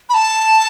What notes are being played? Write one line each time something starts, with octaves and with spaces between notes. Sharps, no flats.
B5
A5